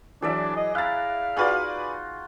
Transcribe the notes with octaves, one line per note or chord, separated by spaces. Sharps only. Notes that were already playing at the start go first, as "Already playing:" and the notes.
E3 F#3 D4 G#4 D5 E5
D#5
E4 F5 A#5 F#6 A6
D#4 F4 F#4 G#4 B4 D5